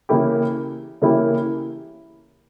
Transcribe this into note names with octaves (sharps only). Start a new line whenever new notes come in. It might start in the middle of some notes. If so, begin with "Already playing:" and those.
C#3 E3 A#3 E4 G4
C#3 E3 A#3 E4 G4